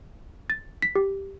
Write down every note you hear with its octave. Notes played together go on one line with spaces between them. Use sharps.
A6
B6
G4